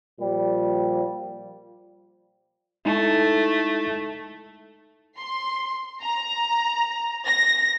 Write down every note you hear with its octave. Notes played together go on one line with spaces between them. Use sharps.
A#2 F3 G3
G#3 A3 D#4 E4
C6
A#5
A#6